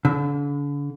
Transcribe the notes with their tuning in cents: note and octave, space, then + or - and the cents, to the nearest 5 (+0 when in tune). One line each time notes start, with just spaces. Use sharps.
D3 -40